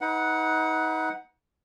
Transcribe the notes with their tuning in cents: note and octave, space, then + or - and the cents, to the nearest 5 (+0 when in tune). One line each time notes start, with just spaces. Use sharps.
D#4 +35 B4 +0 F#5 +0